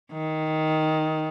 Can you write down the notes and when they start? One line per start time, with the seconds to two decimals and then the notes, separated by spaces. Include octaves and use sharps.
0.12 D#3